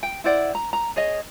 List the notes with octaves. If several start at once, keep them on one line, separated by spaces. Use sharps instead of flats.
G5
E4 C5 D5 F#5
A#5
A#5
G#4 C#5 D#5